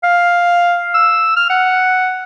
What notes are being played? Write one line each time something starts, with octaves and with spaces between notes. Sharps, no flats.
F5
E6
F6
F#5